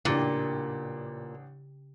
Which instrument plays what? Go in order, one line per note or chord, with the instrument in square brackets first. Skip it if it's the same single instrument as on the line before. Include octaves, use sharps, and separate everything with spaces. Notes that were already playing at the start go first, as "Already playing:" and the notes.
[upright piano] A1 D4 [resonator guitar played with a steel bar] A#2 [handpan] C#3 G4